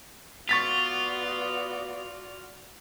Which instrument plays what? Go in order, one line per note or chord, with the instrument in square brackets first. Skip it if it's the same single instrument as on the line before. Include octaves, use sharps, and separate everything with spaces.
[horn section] B3 [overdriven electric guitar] F4 [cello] F#4 D5 [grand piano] C#6 A6 B6